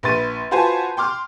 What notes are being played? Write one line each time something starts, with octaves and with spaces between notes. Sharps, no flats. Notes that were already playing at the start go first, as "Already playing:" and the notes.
A#1 B4 C6 A6 D#7
F4 F#4 B4 C5 G#5 A5
G5 C6 D6 F6